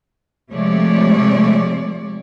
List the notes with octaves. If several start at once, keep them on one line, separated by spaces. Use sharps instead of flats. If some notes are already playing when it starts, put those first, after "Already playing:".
C3 F3 G#3 A3 C#5 D5